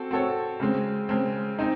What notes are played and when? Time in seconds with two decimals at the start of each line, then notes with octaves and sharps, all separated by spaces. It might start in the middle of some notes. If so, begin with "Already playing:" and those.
Already playing: C4 F#4 A4
0.11 C4 F#4 A4 C#5
0.60 C#3 G#3 C4
1.09 C#3 G#3 C4
1.59 C4 D#4